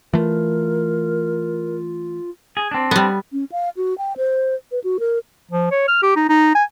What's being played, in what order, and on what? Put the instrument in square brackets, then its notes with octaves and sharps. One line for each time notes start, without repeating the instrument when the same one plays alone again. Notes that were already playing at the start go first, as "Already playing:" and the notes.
[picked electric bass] E3 A3 [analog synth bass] F4 [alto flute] A#4
[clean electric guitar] G#4
C4 D4
[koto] G3 B3
[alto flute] C#4
F5
F#4
G5
C5
B4
F#4
A#4
[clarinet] F3
C#5
F6
G4
D#4
D#4
G#5